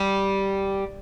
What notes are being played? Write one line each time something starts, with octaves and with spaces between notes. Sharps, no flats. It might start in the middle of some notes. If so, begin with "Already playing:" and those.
Already playing: G3